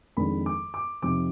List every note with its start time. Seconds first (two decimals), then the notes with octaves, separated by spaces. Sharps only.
0.17 F2 D#3 G#3 D4 B5
0.46 D6
0.74 D6
1.02 F2 C3 F3 C4 D#4 D6